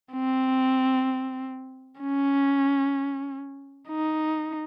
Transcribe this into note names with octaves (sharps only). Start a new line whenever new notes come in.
C4
C#4
D#4